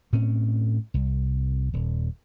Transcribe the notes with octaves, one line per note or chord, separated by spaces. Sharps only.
A2 C4 C#4
C2
D#1